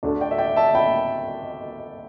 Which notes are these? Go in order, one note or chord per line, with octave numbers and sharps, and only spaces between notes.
D2 D3 A3 D4
D5 G5
E5
D5 G5
E5 A5
G5 B5